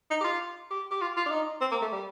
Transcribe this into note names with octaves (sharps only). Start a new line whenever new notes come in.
D#4
G4
F4
G4
G4
F4
F4
D4
D#4
C4
A#3
A3
G3